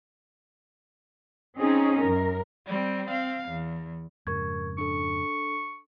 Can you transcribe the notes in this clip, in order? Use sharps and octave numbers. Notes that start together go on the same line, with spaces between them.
C4 C#4 D#4 G#4
F#2 A#4
G3 C4
C4 F5
E2
F2 G#2 C#3 A#4 C#6 G#6
D4 A4 C#6